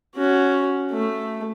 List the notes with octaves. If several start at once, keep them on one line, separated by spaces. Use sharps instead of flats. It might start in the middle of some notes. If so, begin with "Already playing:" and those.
C#4 F#4
A3